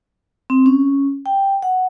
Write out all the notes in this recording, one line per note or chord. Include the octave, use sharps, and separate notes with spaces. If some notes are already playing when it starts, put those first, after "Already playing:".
C4
C#4
G5
F#5